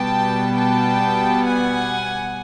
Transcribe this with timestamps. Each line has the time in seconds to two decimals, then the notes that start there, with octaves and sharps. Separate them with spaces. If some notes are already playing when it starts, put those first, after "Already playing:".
Already playing: B2 G3 B3 G5 A5
0.56 G5 A5
1.46 F#5 G#5